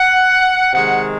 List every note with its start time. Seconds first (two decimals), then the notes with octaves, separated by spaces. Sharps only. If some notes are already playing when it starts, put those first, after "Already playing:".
Already playing: F#5
0.72 C3 D#3 G#3 F#5